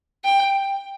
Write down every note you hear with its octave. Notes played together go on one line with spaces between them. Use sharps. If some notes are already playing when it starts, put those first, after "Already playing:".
G5